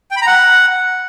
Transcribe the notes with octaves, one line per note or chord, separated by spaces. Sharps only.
G5
B5
A#5
F#5